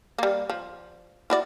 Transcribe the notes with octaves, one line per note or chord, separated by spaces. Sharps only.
G3 A#3
F3
E4 F#4 D5